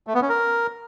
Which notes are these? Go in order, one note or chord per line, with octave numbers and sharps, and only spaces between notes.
A3
B3
C#4
A#4